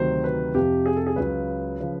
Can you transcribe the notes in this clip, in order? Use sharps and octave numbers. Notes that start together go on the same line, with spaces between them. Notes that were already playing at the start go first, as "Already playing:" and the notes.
Already playing: D2 C3 D#3 F#3 C5
B4
F2 C3 F3 G4
G#4
A4
G#4
C#2 C#3 F#3 B4
C#3 F3